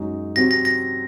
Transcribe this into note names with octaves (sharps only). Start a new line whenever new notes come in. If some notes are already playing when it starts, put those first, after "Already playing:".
Already playing: F#2 C#3 G#3 D#4 F#4
C3 F#3 C4 F#4 A#6
A#6
A#6